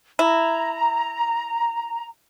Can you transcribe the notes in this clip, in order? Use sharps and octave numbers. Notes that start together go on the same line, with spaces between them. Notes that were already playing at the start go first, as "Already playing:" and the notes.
E4 A#5